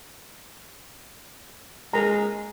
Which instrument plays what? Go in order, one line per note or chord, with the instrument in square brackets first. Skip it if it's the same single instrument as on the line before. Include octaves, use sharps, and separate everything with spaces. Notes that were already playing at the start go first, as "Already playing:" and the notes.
[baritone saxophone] G#3 [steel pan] A#4 A#5